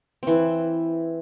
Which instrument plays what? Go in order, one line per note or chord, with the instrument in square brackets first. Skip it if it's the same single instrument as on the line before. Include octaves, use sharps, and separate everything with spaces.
[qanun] E3 C4